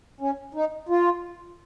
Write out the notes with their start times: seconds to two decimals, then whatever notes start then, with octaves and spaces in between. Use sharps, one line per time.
0.21 C#4
0.55 D#4
0.89 F4